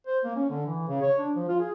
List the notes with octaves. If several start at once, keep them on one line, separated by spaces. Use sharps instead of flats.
C5
A#3
C#4
D3
E3
C#3
C#5
D4
F3
F4
G#4